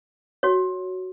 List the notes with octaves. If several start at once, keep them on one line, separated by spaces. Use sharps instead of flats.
F#4 C#5